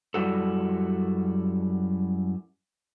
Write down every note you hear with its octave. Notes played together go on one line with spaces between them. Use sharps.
F#2 G3 E4 F#4 A4